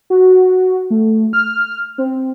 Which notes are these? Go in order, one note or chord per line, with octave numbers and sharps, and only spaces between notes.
F#4
A3
F6
C4